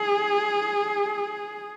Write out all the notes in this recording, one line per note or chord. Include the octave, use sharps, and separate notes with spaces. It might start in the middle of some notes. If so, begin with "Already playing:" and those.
Already playing: G#4